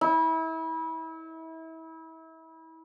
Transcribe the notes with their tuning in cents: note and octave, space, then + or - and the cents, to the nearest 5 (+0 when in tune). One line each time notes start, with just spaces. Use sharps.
E4 -30